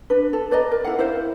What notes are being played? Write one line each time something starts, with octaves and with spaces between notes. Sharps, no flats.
D4 B4
A4
B4 D5 D#5 A#5
A#4
E4 A4 F5 F#5
E4 A#4 C5 F5